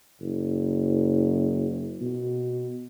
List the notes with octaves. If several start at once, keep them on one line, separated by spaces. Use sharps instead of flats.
F#1
B2